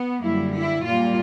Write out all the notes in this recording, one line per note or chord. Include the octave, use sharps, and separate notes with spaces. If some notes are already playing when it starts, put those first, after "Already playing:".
Already playing: B3
F#2 D3 G3 A#3 E4
E4
A#2 G3 A#3 F4